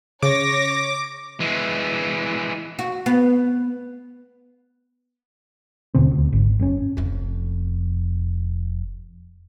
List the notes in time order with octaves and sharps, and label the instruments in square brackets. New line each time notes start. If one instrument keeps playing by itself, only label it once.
[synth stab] C#3 [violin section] C#5 A#6 [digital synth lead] D6
[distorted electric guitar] E3 G#3
[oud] F#4
B3
[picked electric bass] D#1 B2 D3 C4
D2
G#1
F#1 C4 C#4
[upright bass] F1 F2